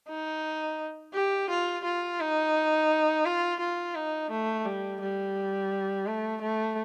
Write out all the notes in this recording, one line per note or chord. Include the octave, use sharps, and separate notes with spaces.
D#4
G4
F4
F4
D#4
F4
F4
D#4
A3
G3
G3
A3
A3